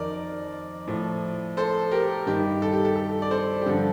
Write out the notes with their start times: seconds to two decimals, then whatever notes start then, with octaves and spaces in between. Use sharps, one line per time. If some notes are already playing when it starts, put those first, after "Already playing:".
Already playing: F2 D#3 A#4 D5 D#5
0.87 A2 F3
1.57 A4 C5
1.91 G4 A#4
2.26 G2 D#3 G4
2.62 A4
2.72 G4
2.85 A4
2.96 A4
3.22 D5
3.31 A4 C5
3.61 G4
3.66 G2 D3 F3 A4